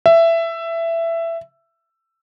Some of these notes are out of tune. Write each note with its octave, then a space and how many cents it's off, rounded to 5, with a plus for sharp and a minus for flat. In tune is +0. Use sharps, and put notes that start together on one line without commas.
E5 +15